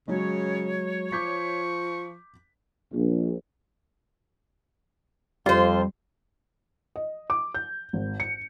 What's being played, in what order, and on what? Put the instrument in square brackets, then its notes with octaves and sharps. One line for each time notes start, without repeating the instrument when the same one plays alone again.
[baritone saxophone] C#3 [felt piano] F#3 G#3 [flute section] C#5
[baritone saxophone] F3 [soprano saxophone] C#6 [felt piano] D6 G6 B6
[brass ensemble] A#1
[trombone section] F2 [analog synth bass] G3 [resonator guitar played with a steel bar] F4 C5
[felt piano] D#5
D6
G6
G#1
C#7